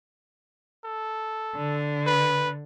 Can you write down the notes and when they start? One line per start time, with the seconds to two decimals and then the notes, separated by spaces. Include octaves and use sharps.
0.84 A4
1.56 D3
2.07 B4